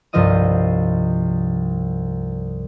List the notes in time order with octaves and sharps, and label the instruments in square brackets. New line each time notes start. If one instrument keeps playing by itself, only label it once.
[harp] C2 G2 F3 F4 D#5 D#6